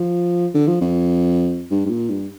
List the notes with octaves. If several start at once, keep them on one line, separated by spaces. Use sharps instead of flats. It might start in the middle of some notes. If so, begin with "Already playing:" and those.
Already playing: F3
D3
F3
F2
G2
G2
A#2
G2